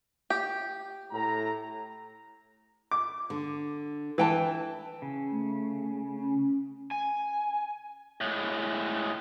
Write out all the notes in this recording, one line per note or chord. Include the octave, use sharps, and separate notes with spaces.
G4
A2 A#5
D6
D3
E3 B4 G5 A5
C#3
A3
C#4
G#5
A2 G#3